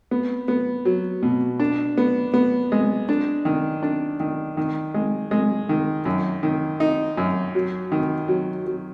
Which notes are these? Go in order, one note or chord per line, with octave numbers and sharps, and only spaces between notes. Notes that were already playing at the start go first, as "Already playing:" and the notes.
B3
B3
F#3
B2
D4
B3
B3
G#3
D4
D#3
D4
D#3
D#3
G#3
G#3
D#3
F#2
D#3
D#4
F#2
F#3
D#3
F#3
F#3